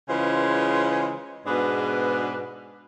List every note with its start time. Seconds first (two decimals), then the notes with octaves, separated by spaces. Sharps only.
0.09 C#3 E3 G#3 F4 B4 C5
1.46 G#2 B2 B3 D4 G#4 B4